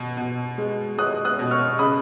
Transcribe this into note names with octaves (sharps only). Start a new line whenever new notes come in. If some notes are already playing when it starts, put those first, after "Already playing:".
Already playing: B2
B2
G#3
G#3 D#6 F#6
D#6 F#6
B2
C#6 F6
C#3 B5 D#6